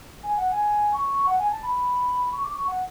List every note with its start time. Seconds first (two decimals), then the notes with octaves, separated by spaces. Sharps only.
0.23 G#5
0.37 F#5
0.51 G#5
0.93 C#6
1.26 F#5
1.38 G#5
1.51 A5
1.63 B5
2.32 C#6
2.43 D6
2.53 C#6
2.67 F#5